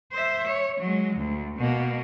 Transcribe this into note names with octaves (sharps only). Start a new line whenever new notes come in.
C5 E5
C#5
F#3 G#3
D2
B2 A#3